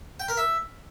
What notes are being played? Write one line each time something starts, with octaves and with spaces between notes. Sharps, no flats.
G5
A#4
E5